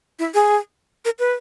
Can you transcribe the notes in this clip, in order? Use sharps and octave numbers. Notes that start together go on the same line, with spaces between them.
E4
G#4
A#4
B4